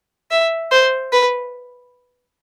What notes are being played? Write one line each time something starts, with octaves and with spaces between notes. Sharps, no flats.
E5
C5
B4